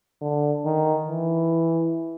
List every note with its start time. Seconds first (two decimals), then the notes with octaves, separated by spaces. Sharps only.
0.21 D3
0.65 D#3
1.08 E3